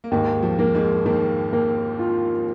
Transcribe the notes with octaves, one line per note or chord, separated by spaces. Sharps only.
A#3
D#2 G#2 G#3
G#3
F2 F3
A#3
G#2 G#3
D#2 D#3 A#3
A#3
F4